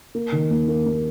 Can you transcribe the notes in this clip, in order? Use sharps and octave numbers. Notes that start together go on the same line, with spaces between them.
A#3
D#3
D#2
A#3
D#2